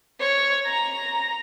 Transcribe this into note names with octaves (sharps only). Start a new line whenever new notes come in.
C#5
A#5